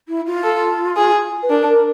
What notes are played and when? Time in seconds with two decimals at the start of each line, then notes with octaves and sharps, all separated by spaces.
0.08 E4
0.26 F4
0.44 A4
0.97 G#4
1.43 B4
1.50 D4 A#4
1.69 A#4